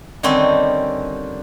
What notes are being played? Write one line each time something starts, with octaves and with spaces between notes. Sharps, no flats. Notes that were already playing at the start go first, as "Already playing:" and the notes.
D3 D#3 G3 C4 C#4